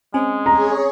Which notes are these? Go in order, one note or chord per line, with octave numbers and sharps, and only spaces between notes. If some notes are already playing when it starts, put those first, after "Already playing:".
G#3 C4 C#4 G#5
G#4 C#5 A#5